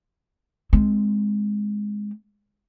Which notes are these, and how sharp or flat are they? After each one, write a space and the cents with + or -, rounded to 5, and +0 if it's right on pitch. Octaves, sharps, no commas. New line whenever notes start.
G#3 +0 C4 +0